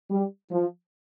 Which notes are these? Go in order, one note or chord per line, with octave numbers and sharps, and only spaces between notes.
G3
F3